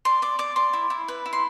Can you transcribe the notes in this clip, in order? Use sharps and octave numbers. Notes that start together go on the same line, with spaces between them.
D5 C6
D5 D6
D5 D6
D5 C6
E4
E4
B4
E4
C6